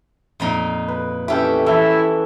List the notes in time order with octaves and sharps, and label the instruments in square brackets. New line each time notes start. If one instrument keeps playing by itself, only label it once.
[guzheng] F2 A#2 D#4
[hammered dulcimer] B4
[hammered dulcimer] E3 A4 G5 [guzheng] C#4 G4 [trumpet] E5
[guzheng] E3 [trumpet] E4 [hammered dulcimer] A4 E5